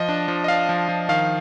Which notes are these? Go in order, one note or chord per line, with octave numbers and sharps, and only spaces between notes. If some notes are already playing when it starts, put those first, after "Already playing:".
Already playing: F3 D#5
D4
F3
D#5
D4 F5
F3
F3
D#3 F5